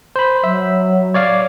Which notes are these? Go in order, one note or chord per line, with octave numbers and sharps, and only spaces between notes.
C5 B5
F#3 E5
C#5 D5 F5